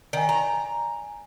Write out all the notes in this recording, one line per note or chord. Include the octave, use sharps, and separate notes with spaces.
D#3 D5 G#5
A#5